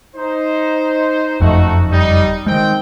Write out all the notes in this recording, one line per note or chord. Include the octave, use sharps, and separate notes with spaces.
D#4 C5
F#1 F2 A3 D#4 F#4
G3 D#4
D#3 G#3 C4 D#4 G5